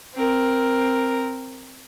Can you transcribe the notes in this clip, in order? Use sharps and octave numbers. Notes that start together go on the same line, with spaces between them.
C4 A#4